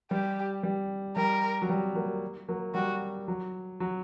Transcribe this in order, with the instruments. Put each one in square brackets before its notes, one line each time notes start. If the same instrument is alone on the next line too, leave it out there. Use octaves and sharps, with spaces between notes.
[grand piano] G3 [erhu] G4
[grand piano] G3
[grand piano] G3 [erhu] A#4
[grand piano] F#3
G3
F#3 A#3
F#3 A#3
[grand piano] G3 [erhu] F#4
[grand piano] F#3
F#3